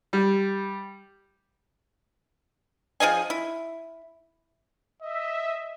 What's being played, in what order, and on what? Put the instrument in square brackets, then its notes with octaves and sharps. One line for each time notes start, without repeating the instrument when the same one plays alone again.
[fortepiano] G3
[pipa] F3 G#4 D#5 G#5
E4
[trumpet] D#5 [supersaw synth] E5